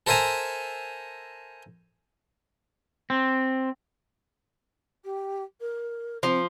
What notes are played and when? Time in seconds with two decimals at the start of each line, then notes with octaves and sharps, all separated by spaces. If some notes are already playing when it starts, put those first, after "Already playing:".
0.07 A4 A#4 C5 E5 G#5 A#5
3.10 C4
5.04 G4
5.60 A#4
6.23 F3 C4